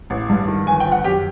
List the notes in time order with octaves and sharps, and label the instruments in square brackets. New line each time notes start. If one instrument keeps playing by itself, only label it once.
[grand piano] A1
G2
D#3
G1 G#5
G5
F3
F#5
F#2 G4 G5